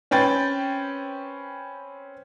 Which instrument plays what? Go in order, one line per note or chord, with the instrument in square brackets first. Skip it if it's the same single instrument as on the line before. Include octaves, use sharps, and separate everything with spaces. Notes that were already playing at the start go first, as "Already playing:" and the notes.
[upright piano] C4 C#4 B4 G5 A6